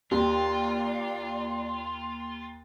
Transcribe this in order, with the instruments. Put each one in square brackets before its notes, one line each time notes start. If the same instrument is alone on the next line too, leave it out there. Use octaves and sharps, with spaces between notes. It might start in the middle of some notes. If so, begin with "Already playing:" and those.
[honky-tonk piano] D#2 [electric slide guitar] F4 [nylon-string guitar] G4 [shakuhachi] D5